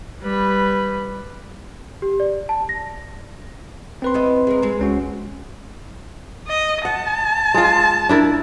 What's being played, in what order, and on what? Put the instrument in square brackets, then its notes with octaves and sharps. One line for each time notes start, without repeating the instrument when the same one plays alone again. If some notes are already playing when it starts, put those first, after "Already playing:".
[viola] G3 B4
[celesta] G4
D5
A5
A#6
[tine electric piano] C4 B4 C6
[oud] B3 E4 D#5
G#3 A#4
G#3 C4
[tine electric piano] C#2 C#4 F#4
[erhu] D#5
[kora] F#5 [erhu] A5
[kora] G#3 F4
D4 E4 A#4